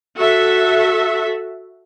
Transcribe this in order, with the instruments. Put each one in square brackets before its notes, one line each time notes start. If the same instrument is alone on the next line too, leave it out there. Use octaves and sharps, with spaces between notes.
[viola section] F#4 A4 E5